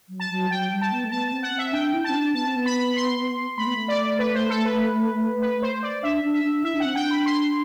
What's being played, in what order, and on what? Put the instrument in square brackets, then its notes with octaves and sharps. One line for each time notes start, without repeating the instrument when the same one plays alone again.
[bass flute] F#3
[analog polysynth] A5
[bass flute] F#3
[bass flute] F#3 [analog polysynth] G5
[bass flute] G3
[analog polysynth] A5
[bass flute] B3
A3
[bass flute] B3 [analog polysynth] A5
[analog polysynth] A5
[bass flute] C4
[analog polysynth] F#5
[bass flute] C4
[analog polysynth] E5
[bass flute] D4 [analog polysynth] G5
[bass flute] E4
[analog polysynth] A5
[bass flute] C4
D4
[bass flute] B3 [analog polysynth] A5
[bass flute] C4
B3
[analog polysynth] B5
C6
[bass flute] A3 [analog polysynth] B5
[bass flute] B3
A3
[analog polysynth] D5
B4
C5
A4
B4
B4
C5
D5
[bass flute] D4 [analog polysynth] E5
[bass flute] D4
[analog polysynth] E5
[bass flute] D4
[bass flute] E4 [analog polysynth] E5
[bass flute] D4
[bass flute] C4 [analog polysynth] F#5
[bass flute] D4 [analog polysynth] G5
[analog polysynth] B5
C6